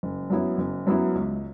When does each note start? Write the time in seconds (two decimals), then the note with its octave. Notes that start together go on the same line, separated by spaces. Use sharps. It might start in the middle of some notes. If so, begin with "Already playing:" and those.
0.03 F#1
0.30 F#2 F#3 B3 E4
0.58 F#1
0.87 F#2 F#3 B3 E4
1.15 C#2